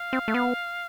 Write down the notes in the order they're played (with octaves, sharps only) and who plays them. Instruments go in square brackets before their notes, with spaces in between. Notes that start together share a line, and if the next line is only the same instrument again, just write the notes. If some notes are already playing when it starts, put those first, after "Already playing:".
Already playing: [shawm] F5
[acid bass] C4
A3
B3